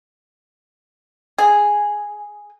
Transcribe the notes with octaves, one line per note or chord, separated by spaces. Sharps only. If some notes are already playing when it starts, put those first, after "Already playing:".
G#4